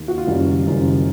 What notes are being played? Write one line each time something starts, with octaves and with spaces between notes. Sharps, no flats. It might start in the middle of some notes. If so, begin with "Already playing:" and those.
Already playing: D#2
F#4
F4
F#1 F#2 D#3 G3
F#1 F#2 D#3 G3